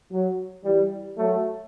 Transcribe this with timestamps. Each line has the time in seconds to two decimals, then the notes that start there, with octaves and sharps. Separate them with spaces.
0.12 F#3
0.64 E3 G3
1.17 F#3 A3